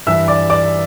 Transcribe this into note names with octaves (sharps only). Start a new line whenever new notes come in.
G2 E3 E5 E6
D5 D6
D5 D6